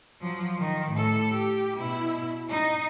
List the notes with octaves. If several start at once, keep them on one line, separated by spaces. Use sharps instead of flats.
F3 F#3
D#3
A2 A4
G4
B2 E4
D#4